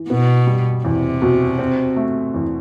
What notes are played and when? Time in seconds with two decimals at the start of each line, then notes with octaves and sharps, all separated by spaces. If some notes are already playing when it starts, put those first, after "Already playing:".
Already playing: E3
0.10 B2 B3
0.47 G3
0.85 E2 C3
1.22 B2
1.59 C4
1.96 A3
2.34 E2